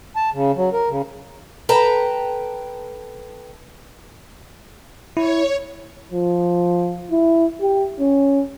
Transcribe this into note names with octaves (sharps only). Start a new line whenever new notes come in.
A5
C#3
F#3
A#4
C#3
A4 B4 G5 A5 A#5
E4 C#5
F3
E4
G4
C#4